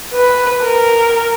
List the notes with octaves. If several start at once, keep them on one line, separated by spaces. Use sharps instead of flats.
B4
A#4